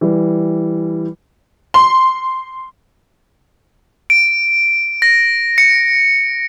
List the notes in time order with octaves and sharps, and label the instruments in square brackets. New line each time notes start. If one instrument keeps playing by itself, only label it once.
[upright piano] E3 G3
[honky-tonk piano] C6
[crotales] D7
A#6
C#7